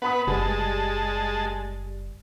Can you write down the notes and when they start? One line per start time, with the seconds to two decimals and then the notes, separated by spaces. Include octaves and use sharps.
0.02 B3 B4 F#5 B5 D#6
0.27 F#1 G3 G#3 A5